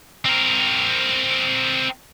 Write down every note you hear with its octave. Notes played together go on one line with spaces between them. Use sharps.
C4 A#4